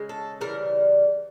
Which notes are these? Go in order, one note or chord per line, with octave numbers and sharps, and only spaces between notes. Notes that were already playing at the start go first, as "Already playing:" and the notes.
Already playing: C#3 G#3
A4
C#3 E3 G3 A#4